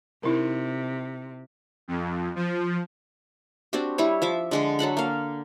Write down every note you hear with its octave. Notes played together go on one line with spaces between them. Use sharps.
C3 D#4 E4 A#4
F2
F3
C4 D4 F#4 G4
G3 E4 C#5
F3 E5 D6
D3 G#3 D4
F#3 A4 F#5 B5
A#3 F5